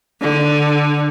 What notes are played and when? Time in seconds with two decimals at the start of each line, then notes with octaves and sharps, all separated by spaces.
0.21 D3